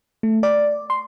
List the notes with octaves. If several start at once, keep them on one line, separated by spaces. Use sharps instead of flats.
A3
D5
C6